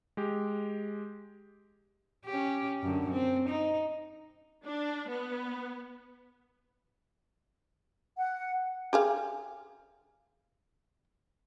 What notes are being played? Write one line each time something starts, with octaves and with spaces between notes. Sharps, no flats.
G#3 G4
C#4 G4
F#2 D3
C4
D#4
D4
B3
F#5
G4 G#4 F5